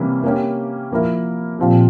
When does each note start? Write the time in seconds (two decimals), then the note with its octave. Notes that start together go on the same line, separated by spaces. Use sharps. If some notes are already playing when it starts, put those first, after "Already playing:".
Already playing: C3 E3 G3 A#3 C#4
0.24 A#3 C#4 G4
0.91 F3 A#3 E4 A#4
1.59 A#2 F3 C4 G4